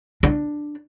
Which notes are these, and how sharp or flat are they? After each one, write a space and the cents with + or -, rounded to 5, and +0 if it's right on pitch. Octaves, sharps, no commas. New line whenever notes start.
D4 +10